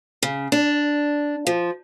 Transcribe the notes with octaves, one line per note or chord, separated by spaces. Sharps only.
C#3
D4
F3